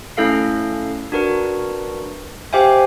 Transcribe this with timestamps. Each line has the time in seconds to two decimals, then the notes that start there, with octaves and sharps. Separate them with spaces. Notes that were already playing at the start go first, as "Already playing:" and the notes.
0.17 A3 C#4 E4 A4 F5 C7
1.12 D4 F#4 A#4 B4
2.53 G4 C5 E5 F5 G5 G#5